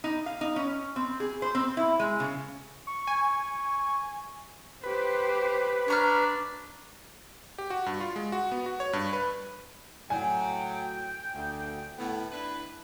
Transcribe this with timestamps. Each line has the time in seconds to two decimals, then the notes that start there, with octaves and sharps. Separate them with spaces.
0.04 D#4
0.26 F5
0.41 D#4
0.56 C#4
0.96 C4
1.20 G#4
1.42 C5
1.55 C4
1.77 E4
2.00 G#3
2.20 C#3
2.87 C#6
3.07 G#5
4.83 G4 B4 C5
5.88 D4 C#5 A#5 F6
7.58 G4
7.70 F#4
7.86 G2
8.00 F4
8.16 G#3
8.32 F#4
8.52 B3
8.66 F#4
8.80 C#5
8.93 G2
9.13 B4
10.10 A2 F#3 G5 G#5
11.34 D2
11.98 A2 B3
12.32 D4 E4 B4